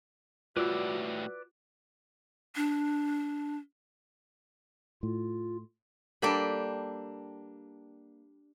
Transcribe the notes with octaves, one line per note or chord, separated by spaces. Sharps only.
A2 G3 F4 F#4 B4 D5 E6
D4
A2 F4
G3 A#3 D4 A4 G5 B5